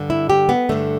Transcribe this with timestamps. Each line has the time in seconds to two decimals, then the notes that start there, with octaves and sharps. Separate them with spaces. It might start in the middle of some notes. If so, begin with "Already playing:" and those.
Already playing: G2 D3
0.10 E4
0.30 G4
0.49 B3
0.69 G2 D3 A3